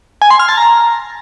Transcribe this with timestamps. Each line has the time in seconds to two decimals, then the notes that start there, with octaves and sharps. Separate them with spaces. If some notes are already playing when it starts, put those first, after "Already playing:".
0.22 G#5
0.31 C6
0.39 F6
0.48 A5
0.57 A#5